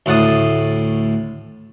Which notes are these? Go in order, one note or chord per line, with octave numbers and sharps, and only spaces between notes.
D2 A2 F#5 A5 D#6